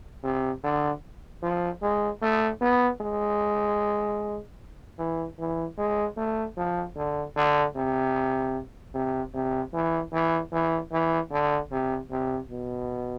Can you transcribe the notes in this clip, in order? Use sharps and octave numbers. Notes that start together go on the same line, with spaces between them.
C3
D3
F3
G#3
A3
B3
G#3
E3
E3
G#3
A3
F3
D3
D3
C3
C3
C3
E3
E3
E3
E3
D3
C3
C3
B2